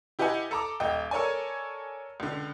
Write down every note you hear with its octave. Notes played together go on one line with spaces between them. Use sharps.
E4 G4 B4 D#5 F#5 G#5
A4 A#5 D6
D#1 D#5 G5
A4 A#4 C#5 D5 G#5
C#2 D3